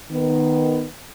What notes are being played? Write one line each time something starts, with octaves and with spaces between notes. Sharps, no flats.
D#3 B3